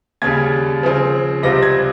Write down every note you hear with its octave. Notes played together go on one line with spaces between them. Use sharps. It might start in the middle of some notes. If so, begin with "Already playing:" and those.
D#2 C#3 G3 G#6
C#3 F3 C4
C#2 C3 G3 C4 F4 A#6
G#6